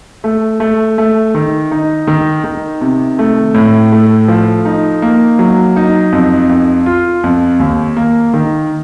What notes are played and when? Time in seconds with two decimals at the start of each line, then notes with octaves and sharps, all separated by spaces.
0.24 A3
0.60 A3
0.98 A3
1.35 D#3
1.71 D#4
2.07 D#3
2.44 D#3
2.81 C3
3.19 A3
3.54 A2
3.92 A3
4.28 F3
4.65 D#4
5.02 A#3
5.39 F#3
5.76 D#4
6.12 F2
6.49 F2
6.86 F4
7.24 F2
7.60 D#2
7.97 A#3
8.34 D#3